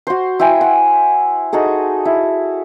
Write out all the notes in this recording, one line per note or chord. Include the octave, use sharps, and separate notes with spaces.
F#4 C5
E4 C5 G5 G#5
F#5
D#4 F#4 G#4 A4
E4